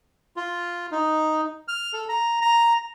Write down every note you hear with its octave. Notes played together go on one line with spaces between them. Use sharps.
F4
D#4
F6
A4
A#5
A#5